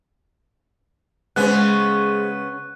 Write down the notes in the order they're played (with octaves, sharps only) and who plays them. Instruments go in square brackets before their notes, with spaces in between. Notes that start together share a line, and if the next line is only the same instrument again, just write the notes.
[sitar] C#3 B3 C#4 [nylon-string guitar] G#3 C5 [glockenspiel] F#6